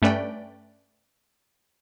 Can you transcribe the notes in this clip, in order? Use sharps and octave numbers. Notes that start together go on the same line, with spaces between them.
G2 A3 C#4 B4 D5 G5